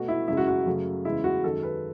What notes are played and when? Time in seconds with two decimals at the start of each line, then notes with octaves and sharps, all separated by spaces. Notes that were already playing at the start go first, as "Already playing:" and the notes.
Already playing: B2 A3 F#4
0.08 E4
0.28 F#2 C#3 G#3 E4
0.37 F#4
0.48 F#4
0.66 F#2 C#3 F#3 A3
1.05 E2 C#3 G#3 E4
1.24 F#4
1.44 F#2 D#3 G#3 A4
1.63 B4